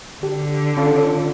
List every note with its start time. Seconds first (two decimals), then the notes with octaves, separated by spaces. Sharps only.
0.23 D3 G4
0.77 C#4 F4 A4